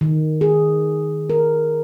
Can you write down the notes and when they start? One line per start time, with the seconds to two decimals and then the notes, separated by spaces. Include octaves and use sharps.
0.01 D#3
0.41 G#4
1.30 A#4